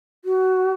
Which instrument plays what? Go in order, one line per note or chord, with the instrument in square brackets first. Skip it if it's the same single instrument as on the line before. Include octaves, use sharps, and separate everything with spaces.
[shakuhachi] F#4